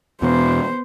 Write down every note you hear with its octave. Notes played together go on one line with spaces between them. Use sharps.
E2 B2 B3 C5